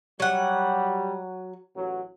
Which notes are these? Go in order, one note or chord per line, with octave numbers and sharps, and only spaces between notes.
F#3 G3 F#5
A1 F#3